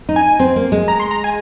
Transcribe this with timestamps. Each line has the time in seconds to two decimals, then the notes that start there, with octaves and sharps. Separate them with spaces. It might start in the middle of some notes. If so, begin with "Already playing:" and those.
0.09 D#4
0.16 G#5
0.40 C4
0.56 A#3
0.72 G#3
0.88 A#5
1.00 C6
1.11 A#5
1.24 G#5